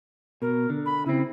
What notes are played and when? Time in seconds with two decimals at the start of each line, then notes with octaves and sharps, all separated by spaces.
0.42 B2 A#4
0.70 D3
0.86 B5
1.06 C#3 C4 E4